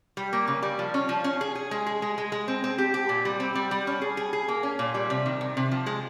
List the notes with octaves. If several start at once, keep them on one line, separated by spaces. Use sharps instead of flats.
G3
A#3
C#3
G3
F3
C#4
F3
C#4
G#4
G#4
G#3
G#4
G#3
G#3
G#3
C4
C4
G4
G4
A#2
G3
C4
G3
G3
C#4
G#4
G#4
G#4
A#3
C#4
A#2
G3
C3
D#3
C3
C3
F3
G#3